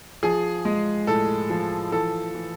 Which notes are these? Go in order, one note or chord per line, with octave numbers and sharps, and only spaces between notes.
F3 G#4
G#3
A2 A4
F3
E3 A4
E3